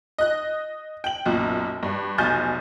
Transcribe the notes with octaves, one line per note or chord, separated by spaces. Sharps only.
D#5 F#6
G5 F#7
B1 F#2 A#2
G2
F1 B1 G#5 F6 G6 A6